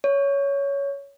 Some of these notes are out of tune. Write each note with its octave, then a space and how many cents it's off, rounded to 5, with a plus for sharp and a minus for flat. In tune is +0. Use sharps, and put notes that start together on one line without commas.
C#5 +15